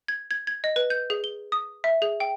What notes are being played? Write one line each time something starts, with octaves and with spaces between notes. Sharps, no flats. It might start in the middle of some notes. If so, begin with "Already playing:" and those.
G#6
G#6
G#6
D#5
B4
G6
G#4
G7
D#6
E5
G#4
G5